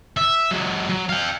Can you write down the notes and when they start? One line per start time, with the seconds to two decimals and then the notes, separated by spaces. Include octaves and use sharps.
0.17 E5
0.51 F#3 G#3
0.89 F#3
1.09 F5 G5